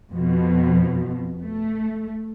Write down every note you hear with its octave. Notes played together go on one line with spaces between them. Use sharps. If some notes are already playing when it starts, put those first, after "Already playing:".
F2 B2 F3
A3